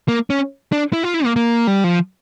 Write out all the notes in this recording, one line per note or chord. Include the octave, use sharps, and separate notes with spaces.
A#3
C#4
D4
E4
F4
E4
A#3
A#3
G3
F3